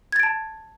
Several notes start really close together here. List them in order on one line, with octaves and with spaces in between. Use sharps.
G#6 A6 D7 A5